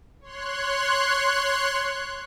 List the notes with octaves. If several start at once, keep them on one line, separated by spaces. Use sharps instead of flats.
C#5 C6 F#6